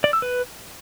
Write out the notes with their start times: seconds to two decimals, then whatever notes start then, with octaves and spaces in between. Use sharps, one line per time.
0.04 D5
0.13 E6
0.22 B4